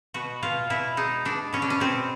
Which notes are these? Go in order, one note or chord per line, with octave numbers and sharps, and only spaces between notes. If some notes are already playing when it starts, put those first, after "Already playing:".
B2 F#4
B2 F4
B2 E4
G#3 D#4
B2 D4
B2 C#4
D4
C#4
B2 C4